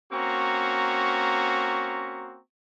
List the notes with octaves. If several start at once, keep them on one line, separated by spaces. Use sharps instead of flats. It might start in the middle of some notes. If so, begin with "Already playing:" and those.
A#3 C4 C#4 F#4 A#5 C#6